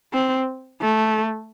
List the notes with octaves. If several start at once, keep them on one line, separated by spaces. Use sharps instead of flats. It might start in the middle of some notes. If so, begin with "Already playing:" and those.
C4
A3